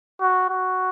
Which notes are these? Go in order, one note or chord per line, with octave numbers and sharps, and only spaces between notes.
F#4
F#4